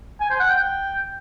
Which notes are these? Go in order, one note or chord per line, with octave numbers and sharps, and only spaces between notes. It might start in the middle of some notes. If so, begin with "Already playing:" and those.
G#5
C5
F#5
G5